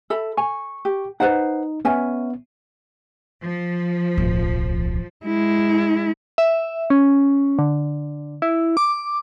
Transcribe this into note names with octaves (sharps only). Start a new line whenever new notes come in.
A4 E5 B5
G#5 C#6
G4
D#4 B4 C5 F#5
B3 C#4 E5 G#5
F3
D1 B1
G#3 E4
E5
C#4
D3
E4
D6